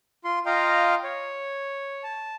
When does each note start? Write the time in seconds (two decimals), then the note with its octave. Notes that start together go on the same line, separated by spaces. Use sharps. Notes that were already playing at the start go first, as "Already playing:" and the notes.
0.25 F4 C6
0.46 F4 D#5 F5 G5 A#5
1.04 C#5
2.03 A5